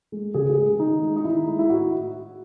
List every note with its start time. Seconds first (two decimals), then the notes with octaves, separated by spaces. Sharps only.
0.12 G#3
0.34 C#3 G#4
0.50 G#4
0.57 G#3
0.79 D#3 D#4
1.02 G#3
1.16 D#4
1.24 D#3 E4
1.47 G#3
1.59 E4
1.70 A2 F#4